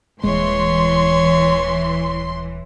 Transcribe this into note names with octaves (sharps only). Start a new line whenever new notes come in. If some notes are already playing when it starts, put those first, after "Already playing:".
D#1 E3 G#3 C#5 C6